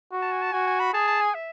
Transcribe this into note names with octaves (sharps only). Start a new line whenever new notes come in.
F#4
A5
G#5
A5
F#4 G#5
G#5
B5
G#4 A5
A5
G#5
E5